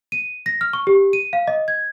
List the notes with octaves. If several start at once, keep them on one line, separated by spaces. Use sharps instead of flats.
D#7
A#6
F6
C#6
G4
D#7
F5
D#5
G#6